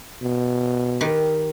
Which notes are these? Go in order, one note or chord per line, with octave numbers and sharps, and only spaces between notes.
B2
D#3 G4 B4